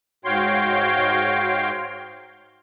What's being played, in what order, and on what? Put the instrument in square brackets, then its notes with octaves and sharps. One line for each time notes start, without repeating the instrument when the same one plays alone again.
[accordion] G#2 F#4 C#5 F5 G5 C6